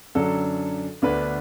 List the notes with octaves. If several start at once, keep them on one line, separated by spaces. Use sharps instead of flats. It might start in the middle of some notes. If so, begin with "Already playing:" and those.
F#2 D3 F#3 D4 A4
D2 D3 B3 D4 B4